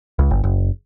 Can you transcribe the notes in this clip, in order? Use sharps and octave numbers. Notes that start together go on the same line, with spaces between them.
C#2
G1
F#1